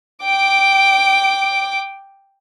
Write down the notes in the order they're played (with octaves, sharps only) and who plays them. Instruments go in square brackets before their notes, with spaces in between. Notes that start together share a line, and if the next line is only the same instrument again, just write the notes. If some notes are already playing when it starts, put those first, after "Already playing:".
[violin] G5 D6